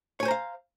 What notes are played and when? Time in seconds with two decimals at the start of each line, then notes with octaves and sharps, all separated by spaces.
0.20 C#5
0.23 G#5
0.25 C5
0.28 A#5
0.31 F5